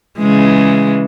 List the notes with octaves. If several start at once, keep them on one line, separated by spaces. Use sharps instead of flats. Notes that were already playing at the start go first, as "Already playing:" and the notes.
C#3 E3 G#3